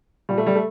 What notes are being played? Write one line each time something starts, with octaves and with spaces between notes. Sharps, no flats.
A#2 G3
A3
G3
A3